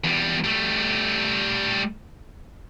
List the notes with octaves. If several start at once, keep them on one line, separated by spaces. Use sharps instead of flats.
E2 G3
G3 A3